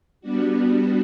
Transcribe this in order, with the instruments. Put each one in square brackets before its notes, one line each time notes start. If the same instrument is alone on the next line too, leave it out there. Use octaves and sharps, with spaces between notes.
[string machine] G3 B3 D4 F#4